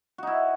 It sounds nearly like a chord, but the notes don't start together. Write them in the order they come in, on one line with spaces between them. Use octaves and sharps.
F#4 D#4 E4